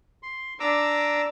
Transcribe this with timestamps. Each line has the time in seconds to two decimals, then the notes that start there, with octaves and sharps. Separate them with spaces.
0.23 C6
0.60 D4 A#5 D6 E6